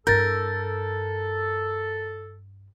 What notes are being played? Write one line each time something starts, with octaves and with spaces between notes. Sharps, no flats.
G2 E4 A4 A#4 G6 A6